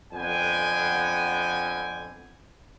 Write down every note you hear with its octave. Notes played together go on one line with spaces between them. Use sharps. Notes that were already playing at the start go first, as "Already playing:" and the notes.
F2 D3 B3 G5 G#5